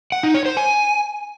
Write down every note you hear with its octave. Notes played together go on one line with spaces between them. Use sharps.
F#5
D#4
C#5
C5
G#5